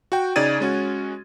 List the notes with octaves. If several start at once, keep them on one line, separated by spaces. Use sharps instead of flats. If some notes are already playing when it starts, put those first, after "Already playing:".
F#4 G5
C#3 D#4 D5 G#6 A6 D#7
G#3 C#4 F#4